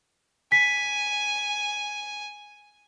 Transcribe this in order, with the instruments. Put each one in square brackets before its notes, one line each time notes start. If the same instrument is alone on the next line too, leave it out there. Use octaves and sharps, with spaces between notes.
[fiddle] G#5 [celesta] B6